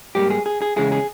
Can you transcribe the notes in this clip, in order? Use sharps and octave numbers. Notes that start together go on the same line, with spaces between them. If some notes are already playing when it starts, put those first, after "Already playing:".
G#2 G3 A#3 G4
G#4
G#4
G#4
E2 C#3 G#3 C#4 E4 G#4
G#4